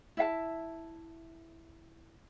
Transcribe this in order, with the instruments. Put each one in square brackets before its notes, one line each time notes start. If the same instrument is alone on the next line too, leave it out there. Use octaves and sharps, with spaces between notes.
[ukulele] E4 E5 F5 A5